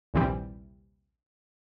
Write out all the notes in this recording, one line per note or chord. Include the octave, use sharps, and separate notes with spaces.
A#1 D#2 C3 E3 G3